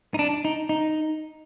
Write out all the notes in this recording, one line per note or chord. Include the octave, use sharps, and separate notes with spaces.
D#4
D4
D#4
D#4